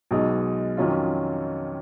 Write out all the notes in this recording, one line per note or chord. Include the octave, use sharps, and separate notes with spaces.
B1 B2 G#3 D#4
F2 D#3 F#3 C#4 F4